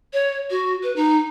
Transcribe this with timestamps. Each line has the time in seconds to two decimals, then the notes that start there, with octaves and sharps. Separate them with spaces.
0.13 C#5
0.50 F#4
0.83 B4
0.96 D#4